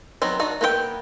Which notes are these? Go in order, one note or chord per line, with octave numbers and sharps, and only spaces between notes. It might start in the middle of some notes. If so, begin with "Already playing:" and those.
F#3 B3 C4 D#4
D4 D#4 F#4
A#3 B3 B4 C5 G5